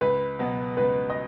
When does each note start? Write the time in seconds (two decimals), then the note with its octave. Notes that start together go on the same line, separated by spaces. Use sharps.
0.01 C#2 B4
0.39 B2 F#3 B3
0.77 C#2 B4
1.10 D#5